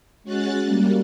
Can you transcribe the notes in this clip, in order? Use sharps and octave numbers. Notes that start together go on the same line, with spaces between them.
G#3 C#4 F#4 F#6 A6
G3 A#3